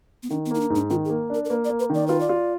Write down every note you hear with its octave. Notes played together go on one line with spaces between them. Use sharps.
B3
D#3 D4
B3
A#3 D#4
D4
G#2
D4
D#3 F4
G#4
A#3
D4 A#4
A#4
A#3 B4
D5
A#3
B4
D#3 D5
F4 B4
D5
F4